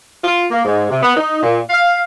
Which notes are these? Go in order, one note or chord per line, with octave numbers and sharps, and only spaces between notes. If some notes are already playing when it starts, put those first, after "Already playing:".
F4
A#3
G#2
C3
B3
D#4
A#2
F5